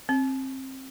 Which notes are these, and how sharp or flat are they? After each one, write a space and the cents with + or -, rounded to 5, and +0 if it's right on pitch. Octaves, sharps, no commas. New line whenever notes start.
C4 +25